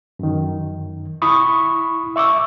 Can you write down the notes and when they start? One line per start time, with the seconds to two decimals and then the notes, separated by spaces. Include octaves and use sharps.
0.19 F#2 D#3
1.22 E4 B5 C#6 D#6
2.16 E5 C#6 D6 E6